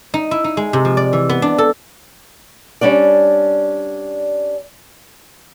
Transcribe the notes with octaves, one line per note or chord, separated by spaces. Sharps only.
D#4
E4
D#4
G#3
C3
F3
D5
E3
B3
D4
A4
G3 C#4 D4 D5